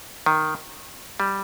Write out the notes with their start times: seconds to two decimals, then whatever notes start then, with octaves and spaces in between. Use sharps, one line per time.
0.26 D#3
1.20 G3